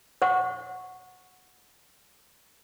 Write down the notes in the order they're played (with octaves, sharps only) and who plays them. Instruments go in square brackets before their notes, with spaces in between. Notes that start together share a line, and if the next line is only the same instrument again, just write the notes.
[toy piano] C5 F#5 C#6